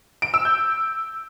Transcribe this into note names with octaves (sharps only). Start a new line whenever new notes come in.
D7
E6
G6